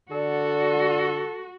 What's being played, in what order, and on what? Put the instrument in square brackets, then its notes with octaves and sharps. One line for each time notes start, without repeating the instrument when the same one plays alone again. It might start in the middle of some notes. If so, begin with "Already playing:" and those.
[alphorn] D3 [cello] F#4 [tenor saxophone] A4 [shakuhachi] D5